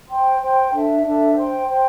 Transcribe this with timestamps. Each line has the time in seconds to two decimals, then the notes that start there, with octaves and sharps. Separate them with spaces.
0.07 C5 G5 C6
0.40 C5 G5 C6
0.72 D4 A4 E5 A5
1.03 D4 A4 E5 A5
1.36 C5 G5 C6
1.68 C5 G5 C6